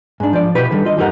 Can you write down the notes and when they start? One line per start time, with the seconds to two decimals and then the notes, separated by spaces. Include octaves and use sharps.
0.20 G#2 D4
0.33 F3 D5
0.55 B2 E4 G4 B4 B5
0.71 D3 D#3 G3
0.85 F4 D#5
0.97 E2 G2 D#4 G4 A#4 F#5